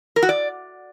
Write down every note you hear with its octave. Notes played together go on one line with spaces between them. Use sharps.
A#4
F#4
D5